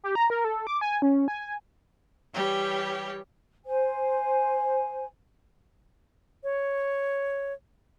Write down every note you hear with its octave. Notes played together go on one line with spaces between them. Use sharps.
G4
A#5
A#4
A4
D6
G#5
C#4
G#5
E3 G3 G4 C#5
C5 G#5
C#5